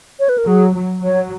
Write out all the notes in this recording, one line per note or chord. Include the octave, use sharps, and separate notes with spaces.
C#5
B4
A#4
F#3 G#4
F#3
F#3 C#5